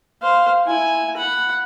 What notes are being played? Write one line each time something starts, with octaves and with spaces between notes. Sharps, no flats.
C5 F5
E4 G#5
F#5 B5